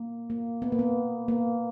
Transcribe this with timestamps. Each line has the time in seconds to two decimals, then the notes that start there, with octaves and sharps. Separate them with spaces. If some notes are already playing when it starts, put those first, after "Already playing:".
Already playing: A#3
0.30 A#3
0.62 B3
0.72 A#3
0.79 B3
1.28 A#3